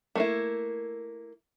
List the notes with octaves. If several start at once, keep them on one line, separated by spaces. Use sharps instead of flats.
A3 A#3 E4